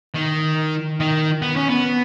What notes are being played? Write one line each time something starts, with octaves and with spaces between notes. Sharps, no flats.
D#3
D#3
B3
C#4
B3